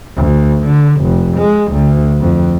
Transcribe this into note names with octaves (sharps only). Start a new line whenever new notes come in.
D2
D3
F1
G#3
D2
F2